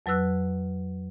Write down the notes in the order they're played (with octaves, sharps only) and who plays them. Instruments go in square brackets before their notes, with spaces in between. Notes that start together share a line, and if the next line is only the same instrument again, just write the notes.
[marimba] F2 F#3 B4 E6 F#6